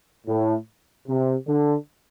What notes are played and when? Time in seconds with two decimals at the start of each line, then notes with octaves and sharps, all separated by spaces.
0.27 A2
1.07 C3
1.47 D3